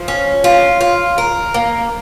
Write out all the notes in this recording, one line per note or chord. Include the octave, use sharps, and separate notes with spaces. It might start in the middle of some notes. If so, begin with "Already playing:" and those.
Already playing: F3
C#4
F4
F4
A#4
A#3